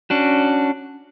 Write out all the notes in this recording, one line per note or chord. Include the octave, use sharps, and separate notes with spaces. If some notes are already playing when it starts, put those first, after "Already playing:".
C#4 D4 F#4